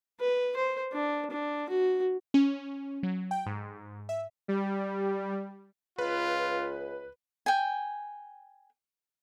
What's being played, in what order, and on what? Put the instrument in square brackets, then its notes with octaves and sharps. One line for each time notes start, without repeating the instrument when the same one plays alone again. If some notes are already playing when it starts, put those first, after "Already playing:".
[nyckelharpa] B4
C5
D4
D4
F#4
[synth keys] C#4
F#3
G5
G#2
E5
[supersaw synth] G3
[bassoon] C#2 [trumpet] F4 [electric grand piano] B4
[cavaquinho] G5 G#5